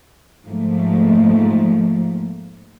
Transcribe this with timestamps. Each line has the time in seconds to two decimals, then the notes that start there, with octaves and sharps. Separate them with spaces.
0.46 G#2 F3 A3 A#3